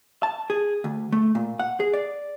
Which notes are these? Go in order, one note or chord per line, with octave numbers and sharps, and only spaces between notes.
A5
G#4
D2
A3
A#2
F#5
G#4
D5